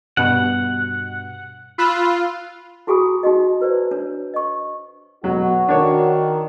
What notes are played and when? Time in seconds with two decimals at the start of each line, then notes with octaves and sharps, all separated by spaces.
0.17 G2 B2 F#5
1.78 F4 B5 E6 F#6
2.87 E4 F#4 G#4 G#5 B5 D#6
3.23 D#4 F#4 D#5
3.60 E4 B4 C5 D5
3.91 D4 C#5
4.34 D#5 C#6
5.24 B2 F#3 F#4
5.68 D#3 D4 C#5